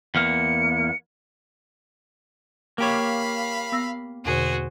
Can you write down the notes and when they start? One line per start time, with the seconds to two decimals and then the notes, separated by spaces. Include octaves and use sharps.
0.15 E2 A#3 C#7
2.78 A#3 G4 C#5 F5 B5
3.72 B3 E6 A#6
4.25 E2 B2 D3 F#4 G#4 C5